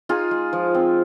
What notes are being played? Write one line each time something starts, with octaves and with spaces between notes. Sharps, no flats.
D#4 F4 G#4
G#3
F3
C4